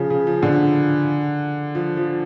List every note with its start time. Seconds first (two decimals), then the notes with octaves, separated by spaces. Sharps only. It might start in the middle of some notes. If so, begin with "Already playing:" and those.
Already playing: C#3 F3
0.10 C#3
0.27 F3
0.43 D3
1.75 F3
1.97 F3